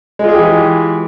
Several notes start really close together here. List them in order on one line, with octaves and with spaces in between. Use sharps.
G#3 F4 G#4 G4 E3